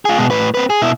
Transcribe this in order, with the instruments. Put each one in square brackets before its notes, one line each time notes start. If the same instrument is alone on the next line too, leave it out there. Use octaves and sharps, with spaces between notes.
[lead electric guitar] F4 G#4
B2 G#3
A2 B4
C4 B4
G#4
B2 E4